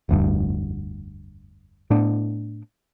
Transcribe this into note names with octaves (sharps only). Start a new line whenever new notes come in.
F1 D2 G2
A2 B3 D4